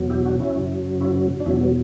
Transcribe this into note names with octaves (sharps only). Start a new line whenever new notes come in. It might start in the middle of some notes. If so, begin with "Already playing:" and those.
Already playing: E2 B2 F#3
E4 G4
D4 F#4
C#4 E4
F#2 C#3 F#3
C#4 E4
D4
E2 B2 F#3 C#4 E4
G3 B3